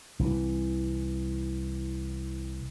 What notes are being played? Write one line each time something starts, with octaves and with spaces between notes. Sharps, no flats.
C2 E3